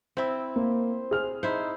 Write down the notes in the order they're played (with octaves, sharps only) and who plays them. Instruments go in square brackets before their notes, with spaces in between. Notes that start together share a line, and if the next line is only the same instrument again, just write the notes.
[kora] C4 E4
[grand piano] A#3 [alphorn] C5
[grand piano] G#4 F6
[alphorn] D#4 [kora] E4 C5